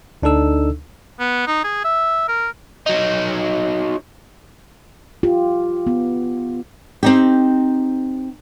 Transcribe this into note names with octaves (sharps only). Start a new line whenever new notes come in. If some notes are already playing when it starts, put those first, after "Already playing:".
D2 D4 D#4 A4 E6
B3
D#4
G#4
E5
A#4
F#3 D#4
F4 G4
B3
C4 D#4 G4